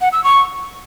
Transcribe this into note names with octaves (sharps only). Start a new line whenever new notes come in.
F#5
E6
C#6